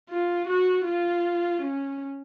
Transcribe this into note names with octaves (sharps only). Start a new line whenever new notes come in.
F4
F#4
F4
C#4